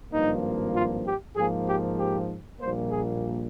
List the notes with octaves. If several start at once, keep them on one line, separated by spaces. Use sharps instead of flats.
G#1 G2 F3 A#3 D#4
F4
G4
G#2 F3 A#3 G#4
G4
G4
A#1 A#2 G3 A#3 C5
G#4